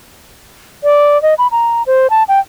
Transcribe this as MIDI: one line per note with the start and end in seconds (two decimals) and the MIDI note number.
0.84 1.20 74
1.22 1.34 75
1.38 1.47 83
1.52 1.83 82
1.87 2.07 72
2.10 2.23 81
2.28 2.39 79